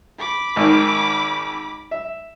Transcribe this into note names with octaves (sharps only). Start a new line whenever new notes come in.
B5 D6
G#1 D#3
E5